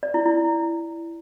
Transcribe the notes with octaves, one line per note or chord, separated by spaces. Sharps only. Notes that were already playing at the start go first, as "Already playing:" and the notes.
D5
E4
E4